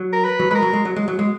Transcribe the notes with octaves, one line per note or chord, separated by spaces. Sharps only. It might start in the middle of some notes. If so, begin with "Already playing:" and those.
Already playing: F#3
A#4
B4
F#3
G#3 A#4 B4
F#3
G#3
F#3
G#3
F#3
G#3